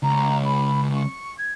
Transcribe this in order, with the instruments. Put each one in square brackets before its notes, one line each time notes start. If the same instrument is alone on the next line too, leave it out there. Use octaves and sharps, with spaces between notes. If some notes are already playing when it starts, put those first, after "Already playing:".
[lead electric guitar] C#2 [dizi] A#5
[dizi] B5
C#6
G#6